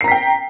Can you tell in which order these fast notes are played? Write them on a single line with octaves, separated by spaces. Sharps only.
C7 A#5 B6 G5